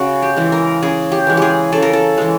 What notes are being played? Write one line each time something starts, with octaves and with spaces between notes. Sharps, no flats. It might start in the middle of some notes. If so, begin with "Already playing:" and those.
Already playing: C#3 F#4
G4
E3 G#3
A#4
C#3 G#4
G4
E3 G#3
G4 G#4
C#3 A4
A#4
A4
E3 G#3